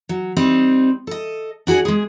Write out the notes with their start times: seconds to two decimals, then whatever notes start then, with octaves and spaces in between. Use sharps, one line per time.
0.09 F#3
0.37 G3 C4 D#4
1.07 A4 D#5
1.67 D4 F#4 G#4 G#5
1.85 G#3 G#4